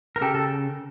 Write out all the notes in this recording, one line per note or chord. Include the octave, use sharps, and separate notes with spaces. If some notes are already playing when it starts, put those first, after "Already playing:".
A#4
C#3 G4 A4
A4